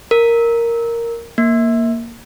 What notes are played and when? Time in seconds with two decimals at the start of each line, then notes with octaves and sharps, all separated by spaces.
0.11 A#4
1.38 A#3